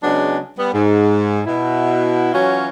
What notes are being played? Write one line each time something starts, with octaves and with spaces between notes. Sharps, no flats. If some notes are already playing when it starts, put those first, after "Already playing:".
C#3 F#3 G#3 B3 D4
G3 B3
G#2
B2 E4
E3 F#3 C#4 F4 F#4